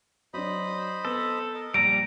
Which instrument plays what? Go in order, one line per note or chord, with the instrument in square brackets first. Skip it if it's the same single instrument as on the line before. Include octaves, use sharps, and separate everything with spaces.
[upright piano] F#3 D4 [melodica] C5 D#5 B5
[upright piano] B3 [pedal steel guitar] A4
[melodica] A#4 D#5
[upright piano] A#1 D#7 [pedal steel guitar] G3 A#5 [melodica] F#5 A5 D6 [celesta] D7